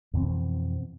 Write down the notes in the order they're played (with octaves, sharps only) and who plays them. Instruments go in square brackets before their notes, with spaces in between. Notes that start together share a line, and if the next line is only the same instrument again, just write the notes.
[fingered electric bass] F2 B2 E3 C4